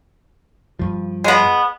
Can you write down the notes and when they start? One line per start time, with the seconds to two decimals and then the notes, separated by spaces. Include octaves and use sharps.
0.79 G2 F3
1.24 G#3 B3